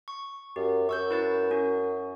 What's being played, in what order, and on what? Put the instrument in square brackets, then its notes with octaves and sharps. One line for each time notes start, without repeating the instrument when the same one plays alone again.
[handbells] C#6
[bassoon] F#2 [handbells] G4
[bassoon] F#2 [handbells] C#6 E6 G6
[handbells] E4 B4 A6
C#4 F#4